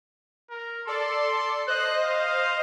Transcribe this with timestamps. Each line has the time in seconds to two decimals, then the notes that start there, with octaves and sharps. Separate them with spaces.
0.50 A#4
0.87 A4 D5 C6
1.68 C5 D#5 F#6
2.03 F5